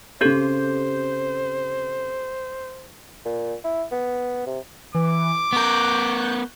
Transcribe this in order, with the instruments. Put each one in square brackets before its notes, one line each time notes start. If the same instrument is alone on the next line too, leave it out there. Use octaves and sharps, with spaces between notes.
[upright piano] C#3 G6 [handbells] C4 G4 A4 [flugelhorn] C5
[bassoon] A#2
E4
B3
C3
[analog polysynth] E3 [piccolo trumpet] D6
[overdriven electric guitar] B3 A#4 [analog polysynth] C#6 F#6 G6